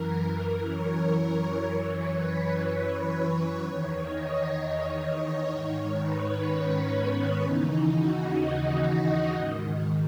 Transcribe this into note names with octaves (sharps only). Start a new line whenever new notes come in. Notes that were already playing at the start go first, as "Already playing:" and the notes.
Already playing: F#2 E3 A#4
C#5
F#2 E3
B4
C#5
E2 D#3
D#5
C#5
G#2 D#3
B4
C#4
B3
D#2 C#3 E3 D#4
F#4
D#5
D#5
G#2 D#3